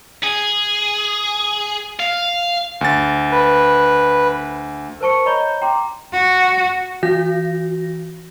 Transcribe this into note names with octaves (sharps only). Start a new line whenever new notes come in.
G#4
F5
D2 A6
B4
A#4 C5 A5 C#6 C#7
C#5 D#5 A#5 B5 G6 G7
G5 A#5 C6 D6
F#4
E3 F#4 A#6